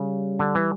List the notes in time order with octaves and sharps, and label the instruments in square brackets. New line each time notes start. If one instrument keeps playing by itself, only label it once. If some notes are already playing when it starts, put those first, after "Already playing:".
Already playing: [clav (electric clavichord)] C#3 [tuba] G3
[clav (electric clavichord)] D3
E3